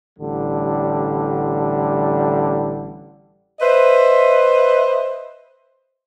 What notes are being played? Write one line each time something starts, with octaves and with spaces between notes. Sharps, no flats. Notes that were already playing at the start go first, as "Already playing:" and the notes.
A1 D3 G3
B4 C5 D#5 E5